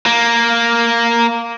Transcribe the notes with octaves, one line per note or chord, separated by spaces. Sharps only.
A#3